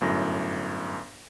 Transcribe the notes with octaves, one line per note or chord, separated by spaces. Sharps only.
G1 F#2 A2 A#6